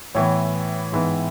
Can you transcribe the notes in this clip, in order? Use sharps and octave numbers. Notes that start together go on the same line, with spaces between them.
A2 E3 B3 C#5
G#2 E3 B3